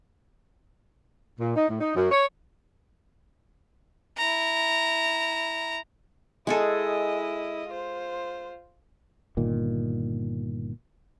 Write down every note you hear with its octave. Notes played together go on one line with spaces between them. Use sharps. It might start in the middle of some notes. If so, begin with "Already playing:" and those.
A#2
D#4
A2
D#4
F#2
C#5
E4 A#5
G#3 E4 G#4 A4 D#5
F4 C5
G1 A#2 D#3